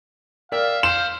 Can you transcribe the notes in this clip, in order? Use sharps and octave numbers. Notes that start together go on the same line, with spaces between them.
A#4 D5 E5 F5 G5
C5 C6 E7